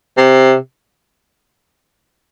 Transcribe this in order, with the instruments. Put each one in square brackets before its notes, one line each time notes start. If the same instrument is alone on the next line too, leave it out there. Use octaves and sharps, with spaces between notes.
[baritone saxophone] C3